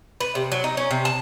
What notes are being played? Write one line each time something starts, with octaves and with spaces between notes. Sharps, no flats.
B4
C3
F#3
D#4
C#4
C3
A5